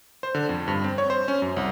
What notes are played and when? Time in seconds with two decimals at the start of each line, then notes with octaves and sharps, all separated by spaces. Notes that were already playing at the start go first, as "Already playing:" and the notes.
0.23 C5
0.35 D3
0.49 F2
0.68 G2
0.84 C4
0.98 C#5
1.10 C5
1.28 C#4
1.42 F#2
1.56 C2